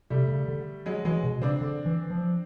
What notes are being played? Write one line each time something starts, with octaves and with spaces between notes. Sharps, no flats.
C3 G3 A3
C#3
D3
F#3 G#3
E3 F#3 G#3
B2
C#3 C4 D4
D3
E3
F3